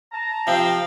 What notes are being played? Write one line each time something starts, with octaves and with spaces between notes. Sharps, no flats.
A5 A#5
C3 F3 C4 F5 G5